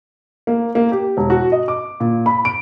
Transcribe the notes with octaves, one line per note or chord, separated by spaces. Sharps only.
A#3
A#3
G4
E1
F#4
D#5
D6
A#2
B5
D7